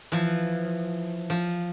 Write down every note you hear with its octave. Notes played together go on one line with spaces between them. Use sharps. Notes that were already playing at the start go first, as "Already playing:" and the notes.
E3 F3
F3